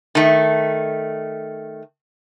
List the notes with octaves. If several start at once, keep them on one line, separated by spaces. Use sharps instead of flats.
D#3 A3